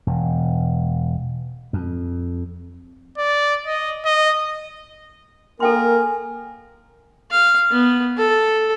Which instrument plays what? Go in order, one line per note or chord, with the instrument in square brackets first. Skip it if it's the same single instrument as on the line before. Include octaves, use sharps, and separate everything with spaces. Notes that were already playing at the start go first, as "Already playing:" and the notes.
[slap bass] E1
F2
[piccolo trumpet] D5
D#5
D#5
[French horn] A#3 [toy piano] A4 G5 C6 [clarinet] A#4 [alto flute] G#5
[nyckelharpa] F5
B3
A4